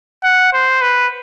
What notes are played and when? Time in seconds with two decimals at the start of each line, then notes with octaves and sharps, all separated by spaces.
0.23 F#5
0.53 C5
0.82 B4